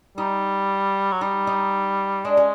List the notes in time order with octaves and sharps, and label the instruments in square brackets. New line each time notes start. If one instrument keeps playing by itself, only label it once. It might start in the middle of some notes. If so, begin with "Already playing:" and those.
[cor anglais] G3 [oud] D#4
[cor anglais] F#3
[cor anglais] G3 [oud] D#4
[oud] D#4
[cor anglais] G#3 [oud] D4
[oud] C#4